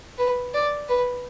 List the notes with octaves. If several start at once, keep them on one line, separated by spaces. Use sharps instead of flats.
B4
D5
B4